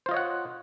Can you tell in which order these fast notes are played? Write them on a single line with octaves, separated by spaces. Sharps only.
C5 F4 D#5 C#5 F#5